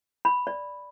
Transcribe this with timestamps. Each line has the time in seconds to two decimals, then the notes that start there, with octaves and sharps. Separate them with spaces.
0.25 B5
0.47 D5